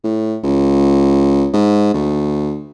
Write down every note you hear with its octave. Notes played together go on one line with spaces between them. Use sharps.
A2
C#2
G#2
D2